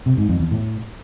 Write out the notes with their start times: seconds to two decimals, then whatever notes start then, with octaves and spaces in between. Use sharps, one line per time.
0.06 C3
0.17 G#2
0.29 F2
0.40 E2
0.51 A2